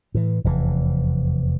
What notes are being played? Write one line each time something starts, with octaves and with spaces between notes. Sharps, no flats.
A2 E3
F1 E2 A#2 E3